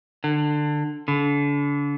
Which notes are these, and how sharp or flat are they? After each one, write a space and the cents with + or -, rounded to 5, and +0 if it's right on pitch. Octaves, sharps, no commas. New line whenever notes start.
D3 +20
D3 -35